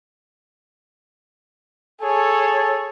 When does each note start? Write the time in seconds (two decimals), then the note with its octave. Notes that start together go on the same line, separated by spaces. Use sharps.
2.02 G#4 A4 C#5